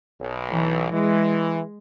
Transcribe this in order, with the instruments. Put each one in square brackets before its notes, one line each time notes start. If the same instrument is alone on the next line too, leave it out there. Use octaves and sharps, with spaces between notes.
[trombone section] B1
[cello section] E3
[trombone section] E3 [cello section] G#3